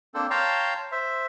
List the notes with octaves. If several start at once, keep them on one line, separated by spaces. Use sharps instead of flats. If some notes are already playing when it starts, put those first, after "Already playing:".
A#3 C4 D4 A4 C5
C#5 F5 G5 A5 A#5 C6
C5 E5